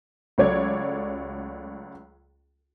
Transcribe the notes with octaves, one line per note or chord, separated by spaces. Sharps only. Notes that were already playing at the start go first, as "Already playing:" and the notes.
C#2 F#3 A3 C#5 D5 G#6